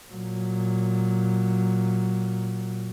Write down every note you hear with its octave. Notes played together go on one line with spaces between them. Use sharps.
A#2 F#3